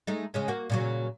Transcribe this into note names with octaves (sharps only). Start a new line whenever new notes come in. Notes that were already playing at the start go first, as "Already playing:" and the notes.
G#3 A3 D#4
C#3 G#3 C#4
A#3 F#4
A#2 C#3 F#3